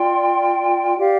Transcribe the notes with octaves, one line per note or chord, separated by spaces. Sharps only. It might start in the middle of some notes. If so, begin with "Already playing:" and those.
Already playing: F4 D5 G5 C6
G4 D5 F5